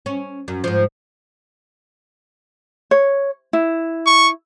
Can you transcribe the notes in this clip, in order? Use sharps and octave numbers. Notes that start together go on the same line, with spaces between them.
C#4
F#2
G#2 F3
C#5
E4
C#6